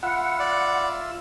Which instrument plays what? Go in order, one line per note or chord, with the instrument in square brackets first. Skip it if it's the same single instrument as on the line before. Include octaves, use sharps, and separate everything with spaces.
[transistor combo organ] F4 E5 [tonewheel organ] F#5 [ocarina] B5
[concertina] D5